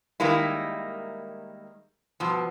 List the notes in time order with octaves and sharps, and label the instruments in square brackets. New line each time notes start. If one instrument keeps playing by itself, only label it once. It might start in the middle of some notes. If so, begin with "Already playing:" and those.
[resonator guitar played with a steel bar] D#3 G3 G#3 A#3 E4
G2 B2 F3